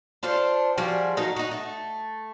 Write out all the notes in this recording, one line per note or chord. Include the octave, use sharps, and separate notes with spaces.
D4 F4 A4 C5
F3 G3 F#4 G#4
F#3 A3 D#4 A#4
D#4 F#4
A3